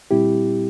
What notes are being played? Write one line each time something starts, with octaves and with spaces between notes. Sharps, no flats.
A#2 G3 C4 E4 G4